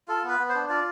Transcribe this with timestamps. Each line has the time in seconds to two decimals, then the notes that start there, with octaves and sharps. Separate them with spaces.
0.08 F4 A4
0.23 B3
0.29 B4
0.40 B3
0.49 C5
0.55 D4
0.69 F4 D5